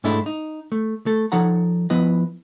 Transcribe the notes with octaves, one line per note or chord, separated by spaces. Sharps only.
G#2 G#3 A3 D4 E4
D#4
A3
A3 A4
F3 D#4 A4 C#5 F#5 A#5
F3 B3 E4 B4 D#5